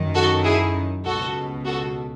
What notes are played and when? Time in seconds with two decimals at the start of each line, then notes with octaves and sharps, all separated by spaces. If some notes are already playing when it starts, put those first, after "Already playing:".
Already playing: F#2 D#3
0.14 F#4 A4
0.44 E4 G#4
1.05 C#2 B2 F#4 A4
1.66 F#4 A4